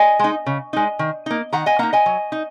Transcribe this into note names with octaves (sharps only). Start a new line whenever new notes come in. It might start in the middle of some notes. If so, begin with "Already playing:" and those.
Already playing: D#5 G#5
G#3 D#4
C#3
G#3 D#4
D#3
A#3 D#4
D#3 F#5 A#5
D#5 G#5
A#3 D#4 F#5 A#5
D#5 G#5
F#3
D#4